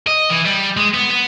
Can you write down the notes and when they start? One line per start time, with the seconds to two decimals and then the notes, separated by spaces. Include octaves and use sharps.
0.07 D#5
0.30 E3
0.46 G3
0.77 G#3
0.94 B3
1.10 B3